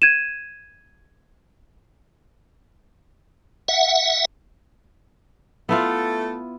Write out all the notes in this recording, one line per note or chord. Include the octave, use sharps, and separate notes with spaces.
G#6 D#7 E7
E5 F#5
A3 B3 E4 F4